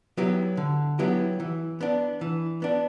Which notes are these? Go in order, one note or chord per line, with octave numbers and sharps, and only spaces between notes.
F#3 B3 E4 G4
D3
F#3 B3 E4 G4
E3
B3 D4
E3
B3 D4